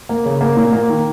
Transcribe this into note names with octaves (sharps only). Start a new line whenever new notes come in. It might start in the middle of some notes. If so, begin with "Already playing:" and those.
A#3
C#3
A#3
A#2
A#3
D#3